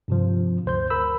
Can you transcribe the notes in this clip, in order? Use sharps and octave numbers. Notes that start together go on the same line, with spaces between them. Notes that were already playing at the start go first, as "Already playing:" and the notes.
G2 C3 F3
D2 C5 G6
A#4 B5 E6